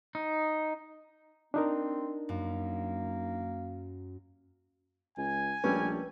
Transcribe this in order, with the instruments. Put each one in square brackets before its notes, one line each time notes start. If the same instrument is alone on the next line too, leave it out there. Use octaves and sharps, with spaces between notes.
[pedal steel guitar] D#4
[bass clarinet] C4 [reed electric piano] D4 D#4 A#4
[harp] F#2 [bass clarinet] A#3
[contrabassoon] C#2 [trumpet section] G#5
[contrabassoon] A#1 [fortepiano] G3 A3 C#4 [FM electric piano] B4